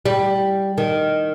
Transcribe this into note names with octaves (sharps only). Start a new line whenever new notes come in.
G3
D#3